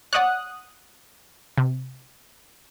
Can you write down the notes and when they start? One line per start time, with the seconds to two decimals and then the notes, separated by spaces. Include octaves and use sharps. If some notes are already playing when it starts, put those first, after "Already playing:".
0.13 C#5 D5 F#5 D#6 F#6
1.58 C3